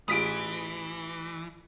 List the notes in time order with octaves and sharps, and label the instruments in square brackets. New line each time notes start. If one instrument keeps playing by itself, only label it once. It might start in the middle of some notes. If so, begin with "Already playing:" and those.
[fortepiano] A1 F4 G#4 [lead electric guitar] E3 [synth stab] D#6 B6 D7